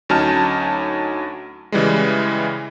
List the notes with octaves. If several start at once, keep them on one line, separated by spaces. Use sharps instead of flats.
D2 F#3 C#4 D#4 A5 F6
C#3 E3 G3 G#3